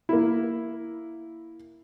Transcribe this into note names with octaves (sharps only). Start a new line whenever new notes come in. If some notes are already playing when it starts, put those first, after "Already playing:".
A#3 E4